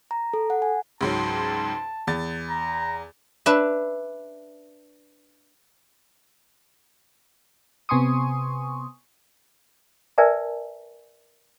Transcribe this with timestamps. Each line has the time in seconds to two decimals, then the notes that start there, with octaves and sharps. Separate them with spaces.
0.11 A#5
0.34 A4
0.50 F#5
0.62 G#5
1.01 C#2 G#2 F#3 A5
2.07 E2 A6
2.50 A#5
3.46 D4 B4 E5
7.89 C3 B3 G#5 C6 C#6 D#6
10.18 A#4 B4 D5 E5 G#5 A5